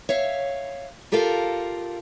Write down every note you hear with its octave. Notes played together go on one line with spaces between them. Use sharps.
C#5 E5 F5
F4 G4 A4 A#4 F5